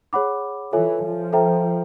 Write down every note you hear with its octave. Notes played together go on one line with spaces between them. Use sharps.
G#4 C#5 F#5 B5 D6
E3 F4 A4 C#5 E5 G#5
F3
A4 C5 E5 G5 A#5